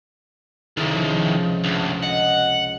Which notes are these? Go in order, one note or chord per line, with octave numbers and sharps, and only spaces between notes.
F1 C#2 D#3 E4
F3
D2 G2
D#5 F#5